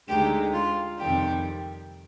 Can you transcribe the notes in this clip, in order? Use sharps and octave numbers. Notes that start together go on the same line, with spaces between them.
D2 D3 G#3 D#4 G4
F4
F2 C3 D#3 G3 G4